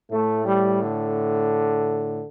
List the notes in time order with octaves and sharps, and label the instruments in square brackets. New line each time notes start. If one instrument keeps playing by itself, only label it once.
[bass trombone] A2 [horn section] A3
[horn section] G3
D3